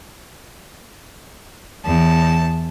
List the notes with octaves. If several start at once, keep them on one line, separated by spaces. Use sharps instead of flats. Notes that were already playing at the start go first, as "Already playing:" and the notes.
E2 A5